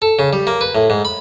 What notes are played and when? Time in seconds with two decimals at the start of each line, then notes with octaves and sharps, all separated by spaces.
0.02 A4
0.19 C#3
0.33 G3
0.47 A#3
0.61 B4
0.75 A2
0.90 G#2
1.05 B5